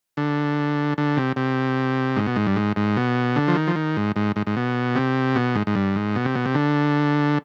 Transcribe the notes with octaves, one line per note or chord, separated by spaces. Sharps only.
D3
D3
C3
C3
G#2
B2
G#2
G2
G#2
G#2
B2
D3
F3
D#3
F3
D#3
G#2
G#2
G#2
G#2
B2
C3
B2
G#2
G#2
G2
G#2
B2
C3
B2
C3
D3